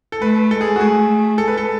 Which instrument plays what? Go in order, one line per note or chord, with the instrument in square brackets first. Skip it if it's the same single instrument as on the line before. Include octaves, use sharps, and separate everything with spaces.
[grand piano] A4
[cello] A3 [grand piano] B4
[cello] G#3 [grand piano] A4
[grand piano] G#4
F#4
[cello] A3 [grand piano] G#4
[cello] G#3 [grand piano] A4
[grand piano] B4
A4